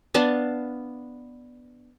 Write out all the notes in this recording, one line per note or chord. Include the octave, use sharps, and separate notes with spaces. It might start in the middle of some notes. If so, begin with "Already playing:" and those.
B3 D4 F5 A5